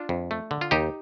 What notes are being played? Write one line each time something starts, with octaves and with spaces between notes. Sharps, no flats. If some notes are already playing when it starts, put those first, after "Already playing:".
Already playing: D4 F4
F2
A3
D3
F4
D#2 D#4 G4